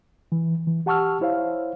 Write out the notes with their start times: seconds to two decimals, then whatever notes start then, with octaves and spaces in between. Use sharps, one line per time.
0.32 E3
0.67 E3
0.86 G4 F#5 A5 C#6 E6 F6
1.21 E4 C5 C#5 F5